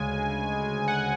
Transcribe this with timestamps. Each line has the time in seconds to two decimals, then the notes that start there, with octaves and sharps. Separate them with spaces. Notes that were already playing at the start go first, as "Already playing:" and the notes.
Already playing: D2 C#3 G#3 G#5
0.88 F#5